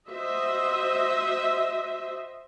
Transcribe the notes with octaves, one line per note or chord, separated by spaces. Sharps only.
F#4 C5 D#5 E5